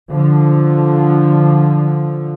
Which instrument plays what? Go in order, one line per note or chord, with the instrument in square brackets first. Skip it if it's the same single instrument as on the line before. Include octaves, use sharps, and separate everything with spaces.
[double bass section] D3 F3